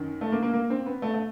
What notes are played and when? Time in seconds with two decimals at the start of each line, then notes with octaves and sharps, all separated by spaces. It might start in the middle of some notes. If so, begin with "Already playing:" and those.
Already playing: F#2 D#3
0.21 A3
0.32 A#3
0.43 A#3
0.54 A#3
0.70 C4
0.86 B3
1.02 A3
1.14 A3